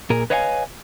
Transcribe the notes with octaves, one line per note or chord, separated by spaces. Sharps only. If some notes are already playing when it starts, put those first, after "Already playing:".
A#2 G#4 A#4
B4 C#5 D#5 F5 F#5 G#5